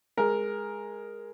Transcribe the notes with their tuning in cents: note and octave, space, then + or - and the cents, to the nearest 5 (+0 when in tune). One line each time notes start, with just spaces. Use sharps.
G#3 +0 A#4 +5